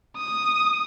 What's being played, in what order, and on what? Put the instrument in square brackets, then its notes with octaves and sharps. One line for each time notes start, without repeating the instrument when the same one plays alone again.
[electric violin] D#6